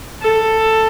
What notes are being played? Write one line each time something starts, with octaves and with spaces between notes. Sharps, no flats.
A4